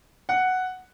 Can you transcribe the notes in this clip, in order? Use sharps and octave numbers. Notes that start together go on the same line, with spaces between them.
F#5